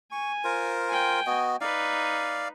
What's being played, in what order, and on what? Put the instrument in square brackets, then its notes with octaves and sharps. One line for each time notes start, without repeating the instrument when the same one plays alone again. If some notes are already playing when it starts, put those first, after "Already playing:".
[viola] G#5 [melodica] C#6
[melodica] F4 A#4 C5
[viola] G5 G#5
[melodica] B3 F#4 D#5
[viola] D#4 B4 [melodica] D5 F5